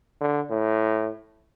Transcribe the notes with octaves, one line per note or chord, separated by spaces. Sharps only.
D3
A2